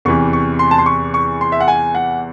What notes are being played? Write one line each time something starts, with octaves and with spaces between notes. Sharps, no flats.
E2 C3 E3 C#6
C#6
C6
A5
C6
C#6
C#6
C6
E5
F#5
G#5
F#5